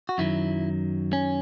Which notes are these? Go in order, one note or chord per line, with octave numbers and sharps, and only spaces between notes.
F#4
F#2 D#3 F#3 E4
C#4